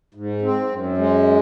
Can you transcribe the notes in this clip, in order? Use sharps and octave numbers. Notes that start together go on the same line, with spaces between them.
G#2
C4
F#2
G#3